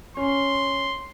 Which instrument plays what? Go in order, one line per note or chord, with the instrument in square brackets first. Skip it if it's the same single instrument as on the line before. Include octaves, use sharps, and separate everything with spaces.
[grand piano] C#4 [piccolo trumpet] C6